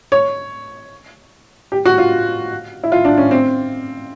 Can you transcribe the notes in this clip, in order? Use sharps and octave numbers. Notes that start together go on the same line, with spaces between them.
C#5
G4
F#4
F4
E4
F4
D4
C#4
C4